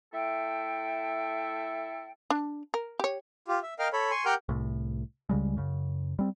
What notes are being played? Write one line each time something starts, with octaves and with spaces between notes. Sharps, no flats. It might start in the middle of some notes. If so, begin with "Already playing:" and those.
A3 E4 A4 E5 G5
D4
A#4
G4 C#5
F4 G4
E5
A#4 D#5 F5 G5 F6
A4 C#5 B5
G#5 C6 C#6
G4 A#4 F#5 G5 F6 G6
C2 A2
C#2 C#3 G3 G#3
F#2 C#3
G3 C4